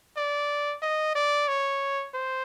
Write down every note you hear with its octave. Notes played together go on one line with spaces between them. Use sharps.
D5
D#5
D5
C#5
C5